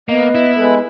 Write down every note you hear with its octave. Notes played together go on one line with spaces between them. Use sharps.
A#3 B3 D#5
E4
G#3 A4 B4